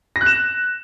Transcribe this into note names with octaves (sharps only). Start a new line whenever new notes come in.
A#6
F#6
E7